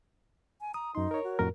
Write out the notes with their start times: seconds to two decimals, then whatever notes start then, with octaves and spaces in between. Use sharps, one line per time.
0.61 G#5
0.74 A#5 D#6
0.95 F#2 D#4 C6
1.11 A#4 C#5
1.24 F#4
1.39 F2 A2 A#4